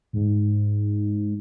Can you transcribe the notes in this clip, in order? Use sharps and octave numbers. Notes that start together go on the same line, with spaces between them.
G#2